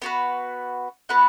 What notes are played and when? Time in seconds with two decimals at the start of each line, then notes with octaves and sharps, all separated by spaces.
0.02 B3 F#4 B4
1.09 B3 F#4 B4 F#5